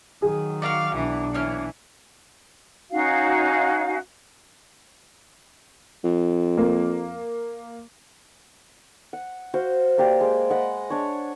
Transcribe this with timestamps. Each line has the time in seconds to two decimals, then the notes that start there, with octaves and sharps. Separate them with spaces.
0.22 D#3 F#3 G#4
0.62 F#4 A#4 D5 F5
0.95 B1 E3 D4
1.34 E3 A#3 C#5 F6
2.91 C#4 D#4 F#4 F5
6.04 F2
6.57 A#3
9.13 F#5
9.54 F#4 C5 F5
9.98 A#3 G4 D5
10.21 G#3
10.50 D#5 F#5 B5
10.90 D4 C#5